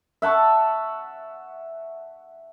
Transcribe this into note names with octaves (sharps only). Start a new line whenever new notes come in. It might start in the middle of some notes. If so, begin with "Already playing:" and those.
E5 F#5 A5 C#6